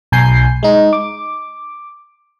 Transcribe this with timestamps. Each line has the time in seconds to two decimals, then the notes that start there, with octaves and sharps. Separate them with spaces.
0.12 B1 G#5 G6 C7
0.63 G#3 D#4
0.93 D6